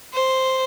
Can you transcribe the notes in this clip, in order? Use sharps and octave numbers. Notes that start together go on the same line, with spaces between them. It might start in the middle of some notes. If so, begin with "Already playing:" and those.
C5